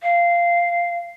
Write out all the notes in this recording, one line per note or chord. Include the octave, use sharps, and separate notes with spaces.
F5